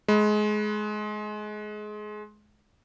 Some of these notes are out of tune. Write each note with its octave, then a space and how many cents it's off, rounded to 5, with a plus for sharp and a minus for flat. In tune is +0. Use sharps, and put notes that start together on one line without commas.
G#3 +25 B5 +0